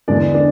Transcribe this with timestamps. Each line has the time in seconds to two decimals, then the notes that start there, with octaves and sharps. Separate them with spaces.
0.08 E2 D3 G#3 D4 D5
0.34 D4 D5